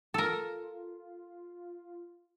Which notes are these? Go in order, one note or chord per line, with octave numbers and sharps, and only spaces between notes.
F4 A4 A#4